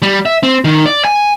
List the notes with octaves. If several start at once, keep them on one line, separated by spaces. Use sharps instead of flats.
G3
E5
C4
D#3
D5
G#5